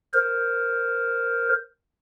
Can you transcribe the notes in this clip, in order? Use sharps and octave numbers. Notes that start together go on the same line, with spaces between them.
A#4 C5